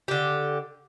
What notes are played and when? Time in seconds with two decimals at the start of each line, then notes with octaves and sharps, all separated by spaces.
0.08 D3 G4